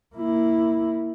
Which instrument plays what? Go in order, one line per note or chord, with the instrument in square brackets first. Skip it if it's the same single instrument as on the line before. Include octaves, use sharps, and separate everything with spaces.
[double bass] A#3 E4